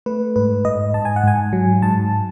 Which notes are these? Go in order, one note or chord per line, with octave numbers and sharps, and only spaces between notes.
A3 B4
G#2 B4
G#2 D#5
G#2 A5
G#5
F#5
G#2 G#5
F#3
G#2 A5